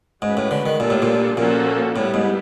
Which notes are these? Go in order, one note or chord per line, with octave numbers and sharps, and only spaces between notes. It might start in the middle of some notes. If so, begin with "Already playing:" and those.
G#2 G#3 C#4 F#4 B4
A2
D3
D#3
A#2 G3 A#3 D4 F4 A4
A2
A#2
A#2 F3 A#3 C#4 F#4 A4
A2 G3 B3 E4
G#2